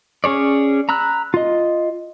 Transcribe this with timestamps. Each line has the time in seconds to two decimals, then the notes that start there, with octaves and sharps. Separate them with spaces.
0.24 C#4 G#4 C#5 D5
0.89 A#5 B5 E6 F#6
1.34 F4 D#5